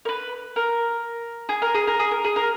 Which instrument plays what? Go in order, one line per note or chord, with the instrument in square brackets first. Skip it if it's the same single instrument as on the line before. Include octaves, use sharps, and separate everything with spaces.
[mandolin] A#4
B4
A#4
G#4
A#4
G#4
A#4
G#4
A#4
G#4
A#4